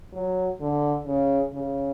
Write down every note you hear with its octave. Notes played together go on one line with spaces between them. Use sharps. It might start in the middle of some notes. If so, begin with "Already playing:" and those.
F#3
D3
C#3
C#3